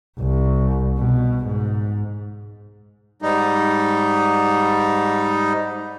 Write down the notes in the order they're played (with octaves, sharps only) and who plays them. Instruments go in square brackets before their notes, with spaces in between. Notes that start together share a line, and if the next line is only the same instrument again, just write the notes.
[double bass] C2
B2
G#2
[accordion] G#2 G3 D#4